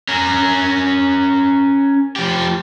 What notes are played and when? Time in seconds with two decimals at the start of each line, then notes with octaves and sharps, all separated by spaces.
0.09 C#4 A#4
2.16 F3 G4